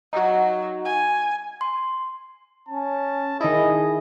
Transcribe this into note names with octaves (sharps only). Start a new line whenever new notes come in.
F#3 D#4 F#4
G#5
C6
C#4 A5
D#3 E4 G#4 D#5